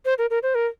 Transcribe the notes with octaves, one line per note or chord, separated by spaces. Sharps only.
C5
A#4
A#4
C5
A#4